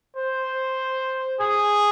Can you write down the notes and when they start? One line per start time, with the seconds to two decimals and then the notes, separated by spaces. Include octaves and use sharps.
0.16 C5
1.40 G#4